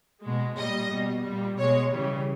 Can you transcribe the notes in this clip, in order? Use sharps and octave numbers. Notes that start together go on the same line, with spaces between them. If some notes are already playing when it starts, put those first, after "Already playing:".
B2 G#3
A#2 G3 D#5
B2 G3
A#2 G3
B2 G#3 C#5
C#3 E3 G3